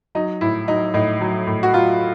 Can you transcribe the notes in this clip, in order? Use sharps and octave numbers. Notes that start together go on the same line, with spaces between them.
F#3 D#4
A2 E4
F#3 D#4
A2 D#4
F#3
A2
F#4
F#3 F4